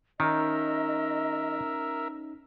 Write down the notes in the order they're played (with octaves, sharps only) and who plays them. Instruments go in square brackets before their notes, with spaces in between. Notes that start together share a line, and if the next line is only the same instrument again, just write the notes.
[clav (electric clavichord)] D#3 [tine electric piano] C#4 D#4 [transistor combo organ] A#4 E5 [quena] D#5